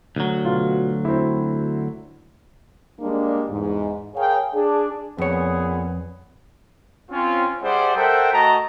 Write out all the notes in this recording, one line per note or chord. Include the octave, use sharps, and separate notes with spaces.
D2 F#3
B2 F4
C4 E4
G3 G#3 A#3 D4
E2 G#2
G#4 A#4 C#5 F5 G5
D4 G#4
F2 A#2 B3 G#4 C#5
C4 C#4 F4
G3 G#4 C5 D5 E5 F#5
A4 A#4 C5 E5 F#5 G5
A3 F#4 D#5 A5 A#5